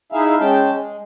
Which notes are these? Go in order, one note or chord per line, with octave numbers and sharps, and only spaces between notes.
D#4 E4 G#4 E5 F5
G#3 C#4 G5 A5
G#3